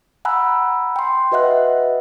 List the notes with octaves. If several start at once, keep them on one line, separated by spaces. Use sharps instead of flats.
F#5 G#5 A#5 B5 E6 F#6
G5 C6
F#4 B4 D#5 E5 F#5 F#6